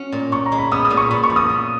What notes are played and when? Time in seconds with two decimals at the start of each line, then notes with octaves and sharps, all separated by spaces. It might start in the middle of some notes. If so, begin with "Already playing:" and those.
Already playing: C#4 F#4
0.12 A#2
0.32 A#2 C#6
0.46 A#5
0.52 G#3
0.58 B5
0.71 B3 D#6
0.85 D#6
0.90 A#2
0.97 C#6
1.10 A#2 B5
1.24 C#6
1.30 F3
1.36 D#6
1.49 B3